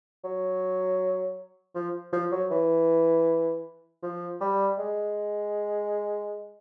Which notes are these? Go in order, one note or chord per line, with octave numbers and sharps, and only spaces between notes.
F#3
F3
F3
F#3
E3
F3
G3
G#3